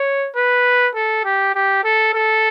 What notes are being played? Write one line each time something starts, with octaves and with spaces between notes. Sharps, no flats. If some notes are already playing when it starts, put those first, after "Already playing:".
Already playing: C#5
B4
A4
G4
G4
A4
A4